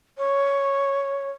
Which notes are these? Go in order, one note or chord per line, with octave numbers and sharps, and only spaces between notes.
C#5